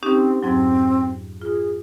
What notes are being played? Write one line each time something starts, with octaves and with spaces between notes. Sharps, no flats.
C4 C#4 D#4 G4
F2 G#2 F#3 C4
F4 G#4